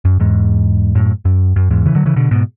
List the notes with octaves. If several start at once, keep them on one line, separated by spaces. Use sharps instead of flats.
F#2
E2 G#2
F#2 A2
F#2
F#2
E2 G#2
C#3 E3
D3 F#3
C#3 E3
B2 D3
G#2 B2